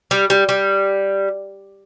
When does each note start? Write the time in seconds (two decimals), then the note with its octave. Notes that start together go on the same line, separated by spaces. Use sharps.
0.11 G3
0.30 G3
0.49 G3